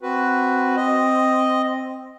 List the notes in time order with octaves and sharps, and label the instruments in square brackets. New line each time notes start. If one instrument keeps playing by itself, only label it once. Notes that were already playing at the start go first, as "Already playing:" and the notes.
[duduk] C4 [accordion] F#4 B4
[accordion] D#5